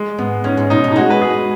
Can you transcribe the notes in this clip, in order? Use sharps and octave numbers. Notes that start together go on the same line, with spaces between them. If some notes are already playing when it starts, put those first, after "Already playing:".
Already playing: G#3
G#2 B3
G#2 C#4
G#2
B2 D#4
B2
D#4
G#3 F#4
B4
G#4